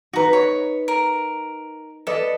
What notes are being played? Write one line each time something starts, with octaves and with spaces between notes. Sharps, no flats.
D#4 F#4 B4 A#5
C#5
A#4
A4 B4 D5 D#5